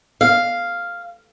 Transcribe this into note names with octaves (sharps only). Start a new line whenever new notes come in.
F5